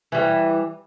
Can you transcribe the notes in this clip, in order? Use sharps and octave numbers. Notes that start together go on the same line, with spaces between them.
E3 G3